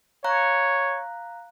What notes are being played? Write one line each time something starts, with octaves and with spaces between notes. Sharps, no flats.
C#5 F5 A#5 F#6